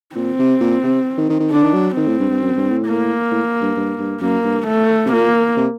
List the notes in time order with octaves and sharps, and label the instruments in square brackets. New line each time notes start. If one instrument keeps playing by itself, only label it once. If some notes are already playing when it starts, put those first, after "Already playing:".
[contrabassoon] A#2 [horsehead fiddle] C4
[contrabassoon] C3
A#2
C3
D#3
D#3
D#3
[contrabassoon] D3 [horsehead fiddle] D4
[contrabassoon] D#3
F#3
[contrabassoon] D#3 [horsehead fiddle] C4
[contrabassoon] A2
G2
G2
F#2
G2
A2
[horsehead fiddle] A#3
[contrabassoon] A2
G2
G2
G2
[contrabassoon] F#2 [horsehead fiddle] A#3
[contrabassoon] G2
[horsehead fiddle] A3
[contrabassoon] C3
[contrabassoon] A#2 [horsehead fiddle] A#3
[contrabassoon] C3